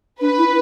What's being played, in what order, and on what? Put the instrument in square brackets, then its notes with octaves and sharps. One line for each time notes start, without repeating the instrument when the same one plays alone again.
[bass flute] D4 [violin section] B4
[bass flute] E4